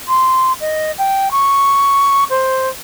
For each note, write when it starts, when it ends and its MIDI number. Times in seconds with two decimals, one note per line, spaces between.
0.08 0.53 84
0.61 0.92 75
0.98 1.29 79
1.31 2.24 85
2.30 2.69 72